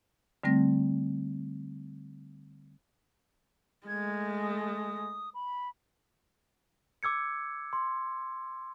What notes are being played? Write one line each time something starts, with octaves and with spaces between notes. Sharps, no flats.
D3 G3 A3 C4 A#6
G#3 A3 G#6
D#6
B5
D6 E6 G#6 C#7
C6